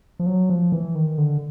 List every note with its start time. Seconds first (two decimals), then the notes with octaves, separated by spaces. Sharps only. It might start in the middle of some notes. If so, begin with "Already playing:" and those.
0.19 F3
0.26 F#3
0.49 F3
0.72 E3
0.95 D#3
1.18 D3